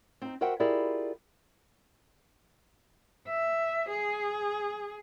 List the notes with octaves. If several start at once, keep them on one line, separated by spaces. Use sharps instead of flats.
C4 D#4
F#4 A#4 C5 E5 F#5 G5
E4 F4 G4 G#4 A#4 D5
E5
G#4